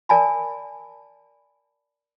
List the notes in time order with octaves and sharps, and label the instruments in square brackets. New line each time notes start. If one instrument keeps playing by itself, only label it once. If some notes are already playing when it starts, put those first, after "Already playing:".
[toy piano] A#4 D5 G#5 A5 B5